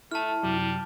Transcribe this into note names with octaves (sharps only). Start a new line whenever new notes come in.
A3 E4 A5 F6
F#2 C3 F#3 G3